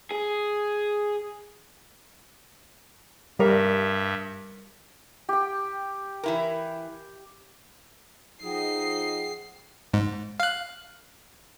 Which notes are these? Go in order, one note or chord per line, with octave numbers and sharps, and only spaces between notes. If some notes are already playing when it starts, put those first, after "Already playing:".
G#4
G2 G3 A#4 E5
G4 G5
E3 E4 A#4
F3 D#4 G#4 D#5 F#5 G5 C7
G#2
F5 F#6